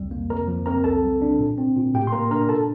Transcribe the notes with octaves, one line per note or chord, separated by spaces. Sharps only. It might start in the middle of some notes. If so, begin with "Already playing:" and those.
Already playing: C2 F2 G3
A#3
F2 A#4 A#5
F3
C4 A#4 A#5
C2 A4 A5
G3
D4
A#2
C4
A#2
A2 G4 G5
C6
A#3 A#4 A#5
D4 A#4 A#5
A#2 A4 A5